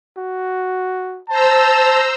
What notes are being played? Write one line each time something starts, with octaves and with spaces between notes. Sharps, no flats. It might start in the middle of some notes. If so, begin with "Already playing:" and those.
F#4
C5 A5 A#5 E6